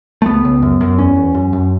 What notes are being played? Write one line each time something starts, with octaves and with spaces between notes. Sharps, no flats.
A3
C#2 B3
C#2
F#2
F#2
E2 C#4
E2
F#2
F#2